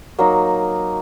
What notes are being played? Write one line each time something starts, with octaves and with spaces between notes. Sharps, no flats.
F#3 A#3 D#4